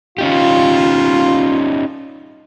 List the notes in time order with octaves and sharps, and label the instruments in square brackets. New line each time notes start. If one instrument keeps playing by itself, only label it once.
[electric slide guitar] C#4 D#4 G4 [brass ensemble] F4